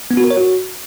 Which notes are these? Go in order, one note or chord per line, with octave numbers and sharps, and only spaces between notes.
B3
F#4
A#4
C#5
F#4